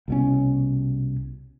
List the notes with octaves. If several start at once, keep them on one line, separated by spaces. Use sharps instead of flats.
C2 B2 C#4